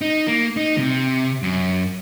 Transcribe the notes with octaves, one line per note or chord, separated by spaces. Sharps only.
D#4
A#3
D#4
C3
F#2